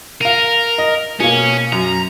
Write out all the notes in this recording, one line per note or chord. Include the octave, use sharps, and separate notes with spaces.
A#4 F5 D#7
D#5
B2 A#3 C#4
F#2 A#5